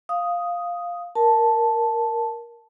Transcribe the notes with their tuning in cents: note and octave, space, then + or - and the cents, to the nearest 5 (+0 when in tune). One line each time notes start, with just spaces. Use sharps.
F5 +0 D#6 +0
A#4 +0 A5 -5